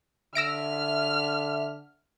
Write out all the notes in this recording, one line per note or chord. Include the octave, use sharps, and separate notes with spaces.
D3 E5 E6 F6 A#6 D7